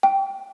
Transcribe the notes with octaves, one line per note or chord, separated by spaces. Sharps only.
G5